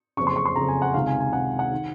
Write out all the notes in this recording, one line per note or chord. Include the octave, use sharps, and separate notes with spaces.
F#1 F2 C#3 C#6
C6
C#6
C6
F#1 F2 C#3 A#5
G#5
F#5
C#2 C3 D#3 F5
G#5
G#5
C#2 C3 D#3 F#5
F#5
D#3